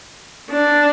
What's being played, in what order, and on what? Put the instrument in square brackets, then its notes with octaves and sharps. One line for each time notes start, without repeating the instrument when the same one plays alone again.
[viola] D4